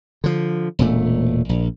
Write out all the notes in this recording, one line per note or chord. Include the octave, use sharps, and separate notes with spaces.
D3 F3
E1 A#2 A3
A#1